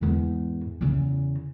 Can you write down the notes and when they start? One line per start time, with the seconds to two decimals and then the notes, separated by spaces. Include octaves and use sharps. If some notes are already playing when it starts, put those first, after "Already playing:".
0.01 E2 G#2
0.81 E2 C#3